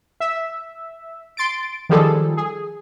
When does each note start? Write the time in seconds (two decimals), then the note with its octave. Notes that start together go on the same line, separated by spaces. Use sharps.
0.20 E5
1.37 C6 A6 D7
1.89 D#3 F3 G3 G#4 A4
2.37 G#4